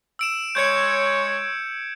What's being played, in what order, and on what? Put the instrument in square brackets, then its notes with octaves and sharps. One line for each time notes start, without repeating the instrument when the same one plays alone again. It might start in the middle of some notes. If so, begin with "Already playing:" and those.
[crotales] E6 D7 E7
[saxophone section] G#3 C#5 [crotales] G6 G#6 C#7